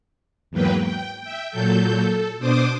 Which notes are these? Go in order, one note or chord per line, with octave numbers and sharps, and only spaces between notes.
E2 G#2 F#3 A#3 B4 G5
G5
E5 G5
A#2 F#3 A4 G6
A4
B2 D4 C5 D6 D#6